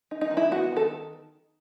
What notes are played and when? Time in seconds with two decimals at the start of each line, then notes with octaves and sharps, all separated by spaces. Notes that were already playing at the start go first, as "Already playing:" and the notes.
0.11 D#4
0.21 D#4
0.31 D#3
0.37 E4
0.51 B3 F#4
0.72 D#3 A4